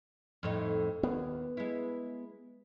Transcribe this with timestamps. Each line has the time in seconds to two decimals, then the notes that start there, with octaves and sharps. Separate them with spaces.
0.43 F2 A2 D#4
1.03 D#2 B3
1.57 G#3 E4